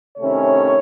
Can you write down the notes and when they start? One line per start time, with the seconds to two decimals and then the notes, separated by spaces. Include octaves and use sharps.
0.18 C3 D#3 A3 C#4 E4 C#5